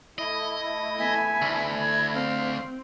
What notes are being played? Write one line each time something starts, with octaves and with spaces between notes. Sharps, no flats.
A3 E4 D#5
B3 E5 G#5
D2
G#6
C4 F5